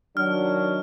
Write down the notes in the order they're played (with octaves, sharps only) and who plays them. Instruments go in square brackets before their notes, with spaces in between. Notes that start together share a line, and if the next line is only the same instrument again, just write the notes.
[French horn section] D#3 F#3 D4 [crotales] F6